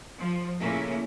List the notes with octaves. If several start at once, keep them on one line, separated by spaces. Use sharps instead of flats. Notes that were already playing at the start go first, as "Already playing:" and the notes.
F3
A#2 C#3 A3 A#3 C#4 E4